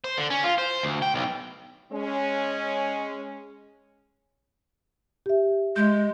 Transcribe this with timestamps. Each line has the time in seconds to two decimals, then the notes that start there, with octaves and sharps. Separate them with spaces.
0.04 C5
0.18 D3
0.30 C#4
0.44 F4
0.58 C5
0.83 D2
1.02 G5
1.14 B1
1.92 G#3 C#4
5.26 G4 E5
5.76 G#3 G6